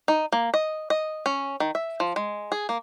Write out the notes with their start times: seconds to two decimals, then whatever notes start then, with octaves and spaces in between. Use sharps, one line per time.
0.08 D#4
0.32 A#3
0.54 D#5
0.90 D#5
1.26 C#4
1.60 D#3
1.75 E5
2.00 F3
2.16 G#3
2.52 G#4
2.69 A#3